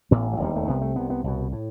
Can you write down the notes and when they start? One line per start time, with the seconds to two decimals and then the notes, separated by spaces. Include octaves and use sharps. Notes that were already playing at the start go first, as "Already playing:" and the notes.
0.11 A1 A2 B3
0.33 F#3
0.39 E1 D#2 G3
0.56 A3
0.68 C2 C3 B3
0.82 A3
0.95 C2 C3 B3
1.10 B3
1.24 C2 B2
1.52 A2